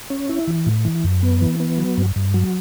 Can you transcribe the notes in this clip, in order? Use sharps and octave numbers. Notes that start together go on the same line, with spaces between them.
C#4
E4
E3
A2
E3
F#2
B3
E3
B3
F#3
G2
G2
F#3